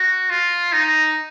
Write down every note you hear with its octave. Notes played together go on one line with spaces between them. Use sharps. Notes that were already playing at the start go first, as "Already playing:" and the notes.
Already playing: F#4
F4
D#4